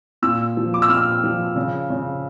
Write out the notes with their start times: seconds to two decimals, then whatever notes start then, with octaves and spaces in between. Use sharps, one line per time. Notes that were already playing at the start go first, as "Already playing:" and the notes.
0.22 A#2 E6
0.57 F3
0.74 D6
0.82 E6
0.89 A#2 F6
1.24 F3
1.56 C#3
1.90 C#3